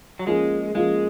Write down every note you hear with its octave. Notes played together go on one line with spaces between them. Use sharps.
F#3
F3 G#3 A#3 C#4 F4 G#4
F3 G#3 A#3 C#4 F4 G#4